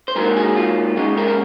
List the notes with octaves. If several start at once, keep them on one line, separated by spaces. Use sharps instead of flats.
C5
G#2 F#3 A#3 A#4
G#4
F4
F#2 C#3 G#3 D#4
A#4
A#4